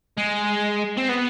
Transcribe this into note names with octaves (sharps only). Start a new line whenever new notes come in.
G#3
C4
B3